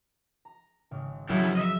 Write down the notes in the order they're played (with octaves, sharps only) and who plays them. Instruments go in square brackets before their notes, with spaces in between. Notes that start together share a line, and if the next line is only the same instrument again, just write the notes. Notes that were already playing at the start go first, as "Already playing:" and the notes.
[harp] A#5
G#1 C#3
[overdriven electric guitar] C#3 E4 [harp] F3 F5 E6 [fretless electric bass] F#3
[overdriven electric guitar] D#5 E5